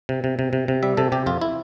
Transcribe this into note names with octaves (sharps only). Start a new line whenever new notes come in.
C3
C3
C3
C3
C3
G3 E5
C3 A4
C3 G4
F2 F4
E4